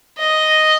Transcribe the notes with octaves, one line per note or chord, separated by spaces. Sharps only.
D#5